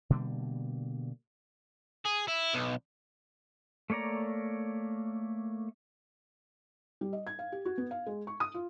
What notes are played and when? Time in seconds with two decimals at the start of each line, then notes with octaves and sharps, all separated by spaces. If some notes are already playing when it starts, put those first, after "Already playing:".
0.10 B2 D3 G3 A#3
2.05 G#4
2.27 E4
2.53 B1
3.90 A3 A#3 C#5 D5 A#5
7.01 G3
7.13 D#5
7.27 G#6
7.39 F5
7.52 G4
7.65 F#4
7.78 B3
7.91 F5
8.07 G#3
8.27 C#6
8.40 D#6
8.54 F4